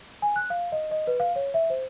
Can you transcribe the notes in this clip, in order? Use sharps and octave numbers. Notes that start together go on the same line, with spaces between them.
G#5
F#6
F5
D#5
D#5
B4
F5
C#5
E5
C5